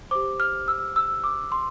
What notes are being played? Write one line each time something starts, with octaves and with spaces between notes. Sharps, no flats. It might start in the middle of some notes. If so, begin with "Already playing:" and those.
G4 C5 D6
F6
E6
E6
D6
C6